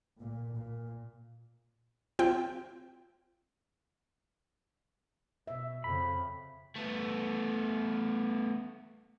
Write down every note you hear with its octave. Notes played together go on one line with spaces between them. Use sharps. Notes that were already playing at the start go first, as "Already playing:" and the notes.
A#2
A#2
C4 F4 G5
B2 E5
F2 C#3 B5
A3 B3